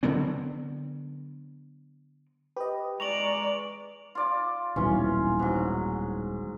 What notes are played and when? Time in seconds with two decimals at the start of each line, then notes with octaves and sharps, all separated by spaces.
0.03 D3 F#3 B3 C4
2.57 G4 B4 D#5
3.00 G#3 D5 A#5 C#6 F7 F#7
4.15 F4 D5
4.76 D#1 B1 E3 C#4 F4
5.39 G#2 F#3